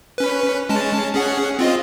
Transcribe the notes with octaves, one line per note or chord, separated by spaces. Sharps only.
C#4 B4
G#3 C#4 A5
C#4 G#4 F#5
C4 F4 D#5